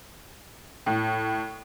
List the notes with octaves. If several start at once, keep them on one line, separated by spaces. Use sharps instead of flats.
A2